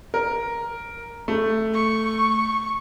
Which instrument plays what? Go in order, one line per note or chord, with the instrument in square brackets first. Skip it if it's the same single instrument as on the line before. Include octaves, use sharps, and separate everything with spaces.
[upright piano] A#4
A3
[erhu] C#6